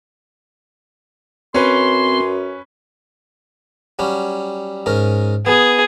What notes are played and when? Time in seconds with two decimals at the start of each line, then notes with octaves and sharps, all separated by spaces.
1.55 F#2 C4 C#4 B4 C6
3.99 F#3 G3 C#4
4.86 G#2 C#4 A#4
5.46 B3 G#4